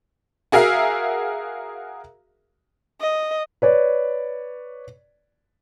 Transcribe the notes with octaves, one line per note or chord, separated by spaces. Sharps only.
F#4 G#4 A#4 E5 F5
D#5
B4 C#5 D5